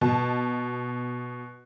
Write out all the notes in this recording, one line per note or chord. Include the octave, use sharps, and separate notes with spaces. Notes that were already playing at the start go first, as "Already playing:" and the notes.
B2 A5